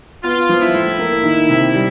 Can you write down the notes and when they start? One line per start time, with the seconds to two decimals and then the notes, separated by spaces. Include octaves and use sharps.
0.24 B3 F4
0.49 F3
0.61 E4
0.74 A2
0.99 A#3
1.23 D#3
1.49 C3
1.75 G3